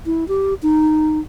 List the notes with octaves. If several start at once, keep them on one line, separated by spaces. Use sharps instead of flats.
E4
G4
D#4